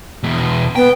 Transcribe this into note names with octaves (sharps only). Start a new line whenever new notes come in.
E2 B2
B3 G5